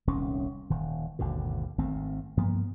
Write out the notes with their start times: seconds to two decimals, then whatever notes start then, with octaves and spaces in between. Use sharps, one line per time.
0.07 D#1 C2 D#3 C#4
0.70 D#1 D#3
1.19 G#1 D#2 B2 D3
1.78 G#1 D#3 A3 C4
2.37 G2 F3 A#3 B3